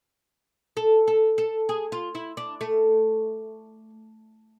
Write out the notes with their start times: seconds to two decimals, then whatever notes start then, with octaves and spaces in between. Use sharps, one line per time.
0.77 A4
1.07 A4
1.38 A4
1.69 G#4
1.92 F4
2.15 E4
2.37 D4
2.61 A3